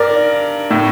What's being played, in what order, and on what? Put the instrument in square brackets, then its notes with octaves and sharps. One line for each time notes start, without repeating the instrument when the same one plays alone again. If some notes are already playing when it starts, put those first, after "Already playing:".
Already playing: [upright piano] G2 A#4 D5
A2